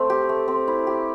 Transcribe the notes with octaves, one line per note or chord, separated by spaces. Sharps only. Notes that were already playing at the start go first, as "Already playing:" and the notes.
Already playing: A3 C4
G4
A3
C4
E4
G4